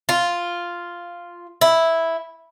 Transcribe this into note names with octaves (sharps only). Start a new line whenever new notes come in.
F4
E4